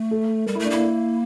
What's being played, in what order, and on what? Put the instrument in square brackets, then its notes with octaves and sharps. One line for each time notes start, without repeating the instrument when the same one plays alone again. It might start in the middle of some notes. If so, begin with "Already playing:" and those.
Already playing: [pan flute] A3
[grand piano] A4
[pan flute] G3 [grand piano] A#4
[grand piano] E4
[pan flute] A3
[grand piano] D4
[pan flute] A#3 [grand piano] E4